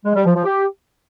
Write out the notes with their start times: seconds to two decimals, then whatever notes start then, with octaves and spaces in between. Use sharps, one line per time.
0.04 G#3
0.15 G3
0.25 F3
0.35 F3
0.45 G4